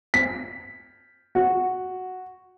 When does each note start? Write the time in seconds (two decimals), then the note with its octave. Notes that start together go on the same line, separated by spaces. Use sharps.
0.14 B6
1.35 F#4